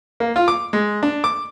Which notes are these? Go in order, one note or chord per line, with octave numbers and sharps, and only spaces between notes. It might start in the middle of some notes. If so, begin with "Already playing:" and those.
A#3
F4
D6
G#3
D4
D6